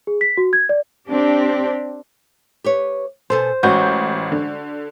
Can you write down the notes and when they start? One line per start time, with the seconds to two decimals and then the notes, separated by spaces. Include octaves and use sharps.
0.07 G#4
0.21 B6
0.37 F#4
0.53 G#6
0.69 D5
1.09 C4 D4 G4
2.64 G4 B4 C#5
3.30 B2 A4 C5 G#5
3.63 A1 G#3 C#4 F#4 G6
4.32 D3